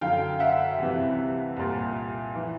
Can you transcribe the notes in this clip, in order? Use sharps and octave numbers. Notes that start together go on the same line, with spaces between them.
F#2 D3 F5 G5
E5 F#5
C2 C3 E3
C2 A#2
E3